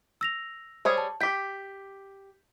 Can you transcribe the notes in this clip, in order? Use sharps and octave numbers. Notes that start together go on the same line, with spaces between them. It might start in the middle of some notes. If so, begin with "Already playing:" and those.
E6 A#6 F7
G3 G#4 C5 C#5
A5
G4 G5 G6 B6